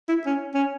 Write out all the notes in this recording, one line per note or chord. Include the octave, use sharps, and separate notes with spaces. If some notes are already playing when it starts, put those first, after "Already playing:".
E4
C#4
C#4